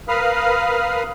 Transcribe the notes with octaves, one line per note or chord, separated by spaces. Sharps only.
A#4 B4 F5 B5 D#6 F6